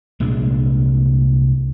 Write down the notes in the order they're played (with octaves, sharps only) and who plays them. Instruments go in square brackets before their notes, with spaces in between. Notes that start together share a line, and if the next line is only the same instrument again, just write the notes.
[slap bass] C2 A#2 G#3 D4